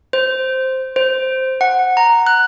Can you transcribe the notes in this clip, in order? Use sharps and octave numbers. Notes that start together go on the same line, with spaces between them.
C5
C5
F#5
A#5
F#6